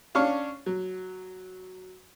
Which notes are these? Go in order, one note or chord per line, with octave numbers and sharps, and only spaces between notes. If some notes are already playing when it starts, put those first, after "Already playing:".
C#4 D4 F5 C#6
F#3